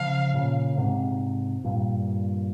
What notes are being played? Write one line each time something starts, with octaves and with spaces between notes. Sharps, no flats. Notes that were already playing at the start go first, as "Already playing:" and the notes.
Already playing: C#3 F3 F5
A#2 C#3
G#2 C3
G2 A#2